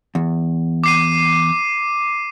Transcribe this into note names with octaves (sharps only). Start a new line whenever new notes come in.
E2
D6 C7 D#7